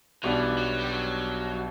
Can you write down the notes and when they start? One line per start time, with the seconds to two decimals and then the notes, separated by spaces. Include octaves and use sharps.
0.23 B1 B2 E3 G3 B3 D4
0.58 F#3
0.80 G3
0.91 F#3